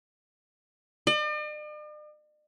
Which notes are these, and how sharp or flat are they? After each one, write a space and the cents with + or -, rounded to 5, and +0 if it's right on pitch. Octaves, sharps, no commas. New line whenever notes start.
D5 +45